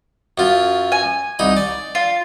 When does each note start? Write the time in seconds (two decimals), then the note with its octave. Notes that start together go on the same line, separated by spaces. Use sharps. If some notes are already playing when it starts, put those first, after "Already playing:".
0.38 F#2 F4
0.92 G#5
1.39 C2 D#4 B5
1.57 D5
1.95 F4